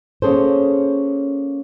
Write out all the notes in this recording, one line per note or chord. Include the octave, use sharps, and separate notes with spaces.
A#3 C#4 G#4 A4 C5